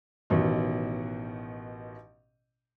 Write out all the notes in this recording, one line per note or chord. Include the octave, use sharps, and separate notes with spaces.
A1 B2 D#3